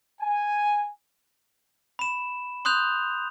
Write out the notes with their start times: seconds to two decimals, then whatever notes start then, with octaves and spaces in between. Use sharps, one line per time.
0.21 G#5
1.99 B5 E7
2.65 C6 D#6 F#6 G6 F7